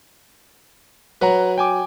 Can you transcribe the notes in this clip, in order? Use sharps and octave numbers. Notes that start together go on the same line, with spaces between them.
F#3 B4 F#5 A#5
G5 G#5 D6